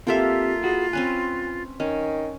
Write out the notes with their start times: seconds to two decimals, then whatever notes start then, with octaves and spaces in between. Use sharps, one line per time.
0.07 A#3 C4 F4 G4 A4 E5
0.62 E4 F#4 G#4
0.93 C4 C#4 B4 G#5
1.80 D#3 C#4